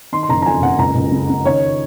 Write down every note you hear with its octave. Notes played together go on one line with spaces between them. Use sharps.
D#3 C6
C6
F#1 A#5
A#5
F2 G#5
F#1 F#5
C#2 A#5
C#2
C#3
C#3
D#3 C#5